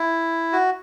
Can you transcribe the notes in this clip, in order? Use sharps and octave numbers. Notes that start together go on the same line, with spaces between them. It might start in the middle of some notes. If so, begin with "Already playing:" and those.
Already playing: E4
F#4